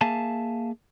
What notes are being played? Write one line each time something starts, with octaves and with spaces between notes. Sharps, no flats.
A#3 G#4 E5 F5 G#5 A5